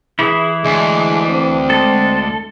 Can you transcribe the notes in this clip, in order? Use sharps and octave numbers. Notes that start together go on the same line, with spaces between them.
E3 E4 G#4
D2 G#3 D4
C4
G#3 A4